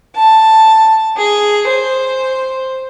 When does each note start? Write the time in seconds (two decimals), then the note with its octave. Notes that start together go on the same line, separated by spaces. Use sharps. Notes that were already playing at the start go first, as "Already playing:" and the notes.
0.15 A5
1.16 G#4
1.67 C5